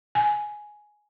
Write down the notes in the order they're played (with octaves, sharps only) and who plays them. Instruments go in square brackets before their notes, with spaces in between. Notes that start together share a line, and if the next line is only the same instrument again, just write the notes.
[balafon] G#5